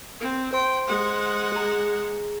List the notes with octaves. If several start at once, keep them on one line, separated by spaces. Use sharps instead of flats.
C4
C5 G5 C6
G#3 F#5
G#4 A#5